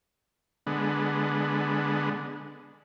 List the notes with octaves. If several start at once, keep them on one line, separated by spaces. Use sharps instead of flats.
D3 G#3 B3